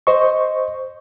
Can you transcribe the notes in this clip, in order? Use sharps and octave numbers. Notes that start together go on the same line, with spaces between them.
C5 D#5 C#6